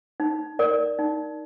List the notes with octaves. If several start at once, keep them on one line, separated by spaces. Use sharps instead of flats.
D#4
A#4 D5
D#4